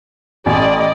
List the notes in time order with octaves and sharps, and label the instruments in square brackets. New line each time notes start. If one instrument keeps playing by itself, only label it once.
[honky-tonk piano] A1 [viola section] D5 D#5